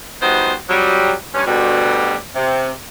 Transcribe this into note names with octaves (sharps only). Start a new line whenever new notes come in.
F3 G3 B3 D#4 F#4 C5
F2 F#3 G3
G2 C#4
D2 B2 G3
C3